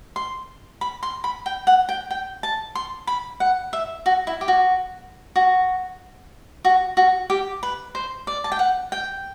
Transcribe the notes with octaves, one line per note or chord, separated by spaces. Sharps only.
C6
B5
C6
B5
G5
F#5
G5
G5
A5
C6
B5
F#5
E5
F#4
E4
G4
F#4
F#4
F#4
F#4
G4
B4
C5
D5
A5
G5
F#5
G5